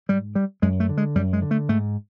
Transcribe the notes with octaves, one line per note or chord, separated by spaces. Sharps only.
G#2 G3
G3
F#2 G#3
A3
D3
G#3
F#2 G3
G#3
D3
A3
G#2 A3